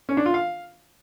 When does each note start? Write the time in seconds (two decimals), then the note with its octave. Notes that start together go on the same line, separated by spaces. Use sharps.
0.09 C#4
0.17 D4
0.26 F4
0.34 F5